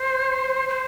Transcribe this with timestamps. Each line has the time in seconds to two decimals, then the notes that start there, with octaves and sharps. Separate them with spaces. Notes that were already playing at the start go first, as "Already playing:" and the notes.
Already playing: C5
0.69 C5